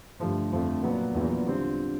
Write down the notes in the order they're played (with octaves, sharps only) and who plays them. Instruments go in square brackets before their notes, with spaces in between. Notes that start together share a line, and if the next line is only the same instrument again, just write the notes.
[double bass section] G2 [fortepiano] D3 F3 A3
[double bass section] F2 [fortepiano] D3 F3 A3
[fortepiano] A#2 F#3 B3
[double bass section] E2 [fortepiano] A#2 F#3 B3
[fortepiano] D3 G3 C4 F4